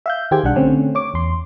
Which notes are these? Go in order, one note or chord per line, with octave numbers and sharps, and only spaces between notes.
E5 F5 G6
D#3 G4 G#4 C5 G5 G#6
B1 G3 D4 F#5
D3 A3 C4 C#4
C#5 D6
E2 C6